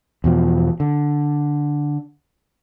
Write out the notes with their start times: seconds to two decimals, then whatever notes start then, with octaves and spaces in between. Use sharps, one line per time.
0.24 E2 B2 F3
0.80 D3